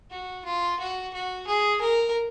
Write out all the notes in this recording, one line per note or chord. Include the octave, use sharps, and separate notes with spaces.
F#4
F4
F#4
F#4
G#4
A#4